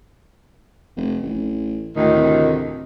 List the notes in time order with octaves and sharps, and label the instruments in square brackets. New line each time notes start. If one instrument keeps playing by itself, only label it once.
[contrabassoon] F1
A1
[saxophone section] D2 A2 D#3
[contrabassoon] C3